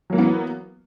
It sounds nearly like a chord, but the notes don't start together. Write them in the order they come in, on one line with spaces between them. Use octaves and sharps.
F#3 A#3 E3 B3